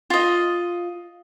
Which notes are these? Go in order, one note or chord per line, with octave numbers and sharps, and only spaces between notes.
F4 D#5